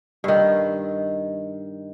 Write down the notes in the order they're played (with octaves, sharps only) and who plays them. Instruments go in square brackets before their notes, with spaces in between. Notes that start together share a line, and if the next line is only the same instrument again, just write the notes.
[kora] G2 D#3